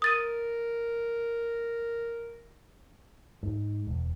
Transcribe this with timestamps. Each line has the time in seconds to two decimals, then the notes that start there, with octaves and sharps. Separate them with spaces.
0.02 A#4 D#6 A6 D#7
3.43 G#2
3.87 E1